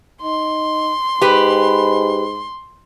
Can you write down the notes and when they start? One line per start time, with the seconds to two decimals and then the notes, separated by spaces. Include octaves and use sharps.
0.22 D#4 C6
1.22 G#2 G4 B4